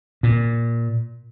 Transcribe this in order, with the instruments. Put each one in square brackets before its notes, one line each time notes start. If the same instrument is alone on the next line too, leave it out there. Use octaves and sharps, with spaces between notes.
[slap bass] A#2